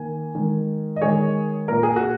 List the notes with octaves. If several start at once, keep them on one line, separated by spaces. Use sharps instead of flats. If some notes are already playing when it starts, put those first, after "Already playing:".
Already playing: D#3 A#3 G#5
D#3 G#3
D#5
D#3 G#3 G#4 C#5
A#2 A#3 A#4
G#4
F#4